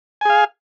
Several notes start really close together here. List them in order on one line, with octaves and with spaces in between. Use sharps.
G#5 G#4 F5